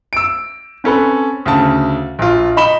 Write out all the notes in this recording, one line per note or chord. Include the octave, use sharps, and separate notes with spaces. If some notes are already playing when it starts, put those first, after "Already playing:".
E6 D7
C4 C#4 A4 B4
D2 C#3 A5
A#1 F4
D#4 B5 E7 G7